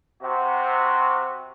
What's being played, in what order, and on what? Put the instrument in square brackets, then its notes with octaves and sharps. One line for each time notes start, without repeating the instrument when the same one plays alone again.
[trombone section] C3 F#4